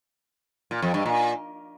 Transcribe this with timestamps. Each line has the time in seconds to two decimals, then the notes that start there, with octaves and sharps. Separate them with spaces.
0.71 A#2
0.82 F2
0.94 G2
1.06 A#2